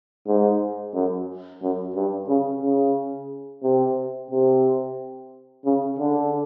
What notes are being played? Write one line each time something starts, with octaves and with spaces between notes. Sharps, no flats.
G#2
F#2
F#2
G2
C#3
C#3
C3
C3
C#3
D3